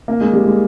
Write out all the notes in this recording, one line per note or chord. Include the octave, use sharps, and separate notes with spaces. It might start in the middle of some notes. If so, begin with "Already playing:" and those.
A#3
G#3
G3
G#3